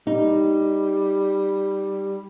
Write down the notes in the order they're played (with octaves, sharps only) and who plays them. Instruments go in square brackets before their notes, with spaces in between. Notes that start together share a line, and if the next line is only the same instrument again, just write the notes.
[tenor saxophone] G3 [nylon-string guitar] D#4